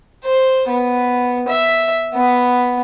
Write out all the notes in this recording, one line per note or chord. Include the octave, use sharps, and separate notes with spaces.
C5
B3
E5
B3